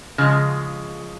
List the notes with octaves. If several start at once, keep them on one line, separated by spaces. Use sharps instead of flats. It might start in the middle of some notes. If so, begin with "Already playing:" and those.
C#3 F3 G#3